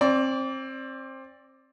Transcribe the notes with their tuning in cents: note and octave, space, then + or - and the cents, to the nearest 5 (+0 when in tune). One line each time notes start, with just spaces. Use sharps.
C4 +25 D5 +0 D6 -30